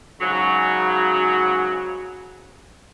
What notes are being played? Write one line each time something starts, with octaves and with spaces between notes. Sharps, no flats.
G#2 C#3 F#3